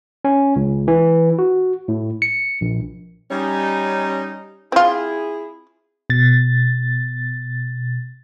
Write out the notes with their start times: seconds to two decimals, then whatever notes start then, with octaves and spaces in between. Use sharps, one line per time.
0.25 C#4
0.56 C#2
0.88 E3
1.39 F#4
1.88 A2
2.22 C#7
2.61 A#1
3.31 G3 C#4 D#4
4.72 C4 E4 F4 G#4
6.10 B2 A6